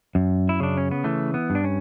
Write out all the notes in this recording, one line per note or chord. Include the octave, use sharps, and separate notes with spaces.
F#2
E4
C#3 D4
C#4
B3
E3 A3
B3
G2
D4
C#4